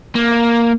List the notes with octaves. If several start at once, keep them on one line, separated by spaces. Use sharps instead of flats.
A#3